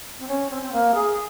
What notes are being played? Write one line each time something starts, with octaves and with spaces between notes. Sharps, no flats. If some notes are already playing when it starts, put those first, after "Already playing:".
C4
C#4
C4
C4
A#3
G#4